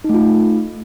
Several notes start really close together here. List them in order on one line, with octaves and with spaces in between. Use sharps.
D#4 A3 F4